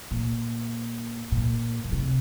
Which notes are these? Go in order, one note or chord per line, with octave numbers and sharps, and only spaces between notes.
A#2
A#2
A#2
C3